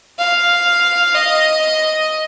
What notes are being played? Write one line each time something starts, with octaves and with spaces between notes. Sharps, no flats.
F5
D#5